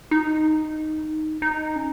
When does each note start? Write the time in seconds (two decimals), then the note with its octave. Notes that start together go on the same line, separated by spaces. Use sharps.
0.11 D#4
1.42 D#4
1.76 C#4